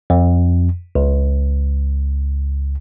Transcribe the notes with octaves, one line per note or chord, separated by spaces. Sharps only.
F2
C#2